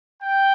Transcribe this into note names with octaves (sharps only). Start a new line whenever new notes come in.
G5